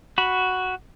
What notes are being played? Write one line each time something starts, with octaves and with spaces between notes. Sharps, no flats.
F#4 B5